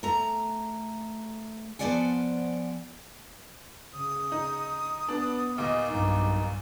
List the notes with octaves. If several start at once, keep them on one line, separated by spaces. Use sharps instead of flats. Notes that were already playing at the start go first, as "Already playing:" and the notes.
A3 A#5
F3 B3 C5 D5 F#5 G#5
C#3 D#6
D#4
B3 D4
D#2 A#2 D#5 D6
B1 G2 D#4